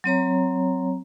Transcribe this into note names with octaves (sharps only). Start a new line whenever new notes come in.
F#3 C4 C#5 A#5